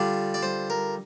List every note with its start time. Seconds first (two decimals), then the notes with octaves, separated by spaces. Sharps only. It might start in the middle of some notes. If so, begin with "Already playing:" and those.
Already playing: D3 G3 D4 F4
0.34 D5
0.43 C5
0.70 A#4